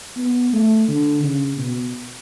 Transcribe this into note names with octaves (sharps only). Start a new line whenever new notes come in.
B3
A3
D3
C#3
B2